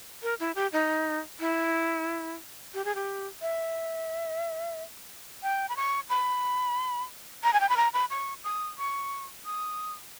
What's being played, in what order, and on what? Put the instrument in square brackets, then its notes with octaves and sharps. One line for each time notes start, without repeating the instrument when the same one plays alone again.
[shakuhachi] A#4
E4
G4
D#4
E4
G4
G#4
G4
E5
G5
B5
C#6
B5
A#5
G#5
G5
B5
A#5
B5
C#6
D#6
C#6
D#6